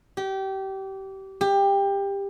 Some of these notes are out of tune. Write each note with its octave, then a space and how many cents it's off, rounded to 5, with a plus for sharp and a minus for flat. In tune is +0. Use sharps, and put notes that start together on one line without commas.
G4 -25
G4 +20